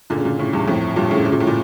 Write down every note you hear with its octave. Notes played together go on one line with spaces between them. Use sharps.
A#2 D3
C#3
A#2 D3
A2 C#3
E2 G2
F2 A2
G2 A#2
A2 C#3
C#3
A#2
A2
A#2